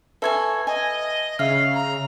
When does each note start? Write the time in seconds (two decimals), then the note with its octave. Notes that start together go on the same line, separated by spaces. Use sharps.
0.22 A4 B4 C#5 E5 G#5
0.67 D#5 G#5
1.39 C#3 E5 F5 F6
1.74 A#5